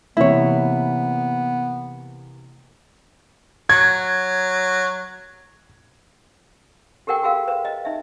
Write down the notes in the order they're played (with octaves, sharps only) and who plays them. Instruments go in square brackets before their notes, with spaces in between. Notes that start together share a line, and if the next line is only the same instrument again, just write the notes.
[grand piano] C3 E3 A#3 [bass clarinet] B3 [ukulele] E4 C#5
[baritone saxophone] F#3 [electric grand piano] G#6
[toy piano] G4 A4 A#4 F#5 G5
F#4 G#4 A#4 F5
B4
D#5
D#4 E5